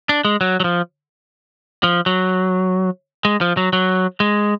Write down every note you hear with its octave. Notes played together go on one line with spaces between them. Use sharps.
D4
G#3
F#3
F#3
F3
F3
F#3
G#3
F3
F#3
F#3
G#3